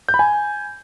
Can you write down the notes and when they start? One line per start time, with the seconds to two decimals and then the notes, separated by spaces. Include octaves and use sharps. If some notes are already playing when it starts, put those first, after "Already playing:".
0.09 G6
0.14 B5
0.19 G#5